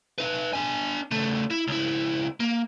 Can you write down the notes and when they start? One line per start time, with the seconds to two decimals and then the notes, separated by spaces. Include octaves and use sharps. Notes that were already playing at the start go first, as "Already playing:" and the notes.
0.18 D#4 B4
0.53 D4 G#5
1.11 C#3 A3
1.51 E4
1.67 C#2 E4
2.40 A#3